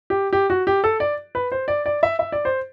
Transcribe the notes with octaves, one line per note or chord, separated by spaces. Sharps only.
G4
G4
F#4
G4
A4
D5
B4
C5
D5
D5
E5
E5
D5
C5